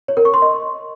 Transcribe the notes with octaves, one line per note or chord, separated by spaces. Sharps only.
C#5
A#4
C#6
C6
D#5